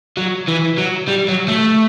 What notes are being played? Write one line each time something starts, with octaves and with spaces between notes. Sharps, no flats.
F#3
E3
F#3
G3
F#3
A3